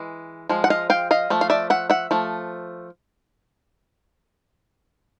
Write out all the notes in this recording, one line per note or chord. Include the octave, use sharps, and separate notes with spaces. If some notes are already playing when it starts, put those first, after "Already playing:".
Already playing: E3 G#3
F3 G#3
F#5
D#5 F5
F5 G5
D#5 F5
F3 A3
F5
D5 E5
E5 F#5
E5 F#5
F3 A3